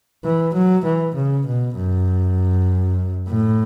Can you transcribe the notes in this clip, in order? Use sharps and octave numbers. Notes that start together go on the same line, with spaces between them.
E3
F#3
E3
C#3
B2
F#2
A2